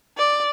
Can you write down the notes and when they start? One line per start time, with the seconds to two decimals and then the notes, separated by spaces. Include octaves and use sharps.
0.18 D5